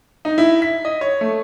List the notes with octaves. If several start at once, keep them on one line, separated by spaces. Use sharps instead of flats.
D#4
E4
B6
D#5
C#5
A3